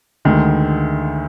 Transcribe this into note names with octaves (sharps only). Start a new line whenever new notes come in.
D2 D3 D#3 G#3